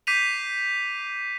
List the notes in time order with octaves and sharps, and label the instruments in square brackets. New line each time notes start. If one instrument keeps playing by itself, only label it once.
[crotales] D6 G6 B6 C7 D#7 F7